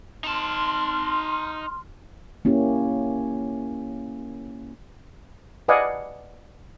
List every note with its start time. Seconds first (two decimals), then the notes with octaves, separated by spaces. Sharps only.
0.24 D#4 A5 C6 F6
2.45 A#3 C#4 E4 G4
5.68 B4 D5 D#5 F5 F#5 G#5